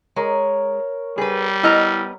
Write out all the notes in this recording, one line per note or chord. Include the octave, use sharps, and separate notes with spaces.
G#3 A#4 C#5
G3 G#4 B4
B3 E4 D#5 A#5 E6 F6